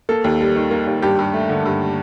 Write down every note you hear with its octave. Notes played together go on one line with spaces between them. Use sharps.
A#3 A4
D#2
G3
D#3
A#3
D#2
G2 G4
G2
A3
D3
G2